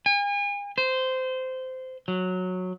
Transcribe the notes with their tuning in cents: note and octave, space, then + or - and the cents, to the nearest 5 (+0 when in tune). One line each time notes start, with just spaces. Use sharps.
G#5 -40
C5 -15
F#3 -10